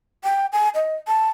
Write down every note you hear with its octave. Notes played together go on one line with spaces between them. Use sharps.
G5
G#5
D#5
A5